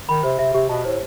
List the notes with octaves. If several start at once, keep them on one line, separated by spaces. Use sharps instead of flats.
D#3 B5
C3 C5
C3 E5
C3 G4
B2 A5
A2 C5